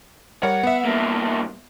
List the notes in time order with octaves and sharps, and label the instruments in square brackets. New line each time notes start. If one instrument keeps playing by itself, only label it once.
[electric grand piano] G3 A#4 C#5 [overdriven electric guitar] F#5
[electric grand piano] B3 E5
[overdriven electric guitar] G2 A#3